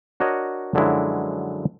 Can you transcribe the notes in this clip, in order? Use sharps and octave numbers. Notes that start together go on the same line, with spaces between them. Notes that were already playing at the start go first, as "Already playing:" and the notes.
D4 F#4 A#4 C#5 D#5
F#2 D3 F3 F#3 G#3 E4